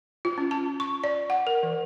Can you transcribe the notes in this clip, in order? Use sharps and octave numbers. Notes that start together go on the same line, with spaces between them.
F4
C#4
A5
C#6
D5
F#5
A#4
E3